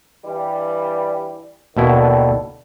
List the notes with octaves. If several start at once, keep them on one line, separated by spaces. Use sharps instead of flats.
G2 E3 G3
D#2 B2 D3 D#3 E4